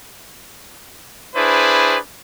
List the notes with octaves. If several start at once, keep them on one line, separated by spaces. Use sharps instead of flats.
D4 E4 G#4 B4 C5